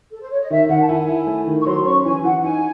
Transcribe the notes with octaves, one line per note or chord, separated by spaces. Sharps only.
A4
C5
C#5
D#5
D#3 E5
D#3 F#5
A5
E4 G#5
E4
A3
D#3
C#6
F#3 C6
C#4 C#6
E3 G#5
E3 F#5
D#4 G#5